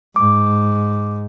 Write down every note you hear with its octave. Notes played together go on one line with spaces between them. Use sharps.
G#2 D6